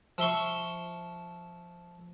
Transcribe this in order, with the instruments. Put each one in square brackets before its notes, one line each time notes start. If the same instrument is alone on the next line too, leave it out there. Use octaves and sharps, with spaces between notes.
[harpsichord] F3 E5 C6 C#6